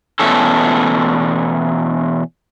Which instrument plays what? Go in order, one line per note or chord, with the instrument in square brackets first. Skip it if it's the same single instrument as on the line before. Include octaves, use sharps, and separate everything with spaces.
[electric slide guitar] E2 B2 A3 C#4 A4